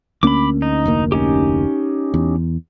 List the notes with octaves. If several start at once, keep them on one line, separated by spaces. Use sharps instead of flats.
D2 A#3 C#4 B5 D6
D#4
F1 D2 A#3
C#4 D#4 G4
E2